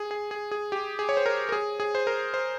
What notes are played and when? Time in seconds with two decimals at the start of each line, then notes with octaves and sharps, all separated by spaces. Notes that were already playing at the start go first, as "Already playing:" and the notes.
Already playing: G#4
0.11 G#4
0.31 G#4
0.51 G#4
0.72 G4
0.99 G#4
1.09 C#5
1.17 C5
1.26 A#4
1.49 A#4
1.52 G#4
1.80 G#4
1.95 C5
2.07 A#4
2.34 C5